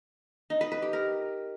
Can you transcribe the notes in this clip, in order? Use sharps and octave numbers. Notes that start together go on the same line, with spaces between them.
D#4
B4
B4
G4
A#4